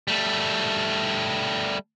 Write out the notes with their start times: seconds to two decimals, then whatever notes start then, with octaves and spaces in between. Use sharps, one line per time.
0.08 G3 A3